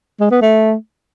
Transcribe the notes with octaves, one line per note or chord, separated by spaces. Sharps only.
G#3
B3
A3